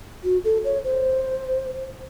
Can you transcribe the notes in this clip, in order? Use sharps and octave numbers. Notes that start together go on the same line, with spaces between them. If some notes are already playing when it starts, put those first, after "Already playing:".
F#4
A4
C#5
C5